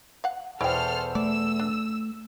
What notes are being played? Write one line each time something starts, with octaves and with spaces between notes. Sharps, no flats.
F5 F#5
E2 B2 E4 A4 C5 G5 F6
A3 D5 E6
D4